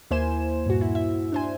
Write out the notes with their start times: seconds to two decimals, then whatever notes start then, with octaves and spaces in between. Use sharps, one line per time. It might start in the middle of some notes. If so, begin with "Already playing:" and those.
0.11 D#2 A#3 E4 C5 G#5 E7
0.66 G2 A#2 F#4
0.81 E4
0.95 E5
1.32 D4 C5 G#5